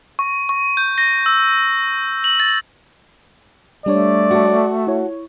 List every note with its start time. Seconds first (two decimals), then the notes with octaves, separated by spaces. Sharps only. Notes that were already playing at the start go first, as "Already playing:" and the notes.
0.19 C#6
0.49 C#6
0.77 G6
0.98 A#6
1.26 E6
2.24 F#7
2.40 A6
3.86 G3 A3 D4 C#5 D5
4.31 F#4 A4
4.87 E4 C#5